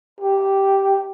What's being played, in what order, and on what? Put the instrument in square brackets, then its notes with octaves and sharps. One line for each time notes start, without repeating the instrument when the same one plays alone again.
[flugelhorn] G4